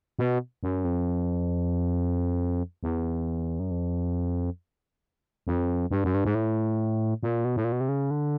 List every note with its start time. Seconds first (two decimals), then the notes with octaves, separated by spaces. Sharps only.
0.19 B2
0.63 F#2
0.85 F2
2.83 E2
3.60 F#2
3.71 F2
5.47 F2
5.91 G2
6.04 F#2
6.14 G2
6.25 G#2
6.35 A2
7.23 A#2
7.45 B2
7.56 A2
7.64 A#2
7.72 B2
7.80 C3
7.89 C#3
8.11 D3